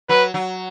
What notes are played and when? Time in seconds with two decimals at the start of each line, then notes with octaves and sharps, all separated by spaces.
0.09 F#3 B4
0.34 F#3